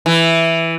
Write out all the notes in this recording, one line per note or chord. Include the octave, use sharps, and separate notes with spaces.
E3